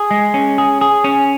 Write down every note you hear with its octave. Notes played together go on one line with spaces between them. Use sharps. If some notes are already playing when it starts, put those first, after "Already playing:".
Already playing: G#4
G#3
C#4
G#4
G#4
C#4